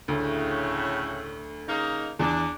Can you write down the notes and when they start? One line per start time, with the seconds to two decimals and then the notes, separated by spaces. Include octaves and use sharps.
0.08 D2 A2 C#3
1.67 C#3 A#3 D#4
2.19 E2 D4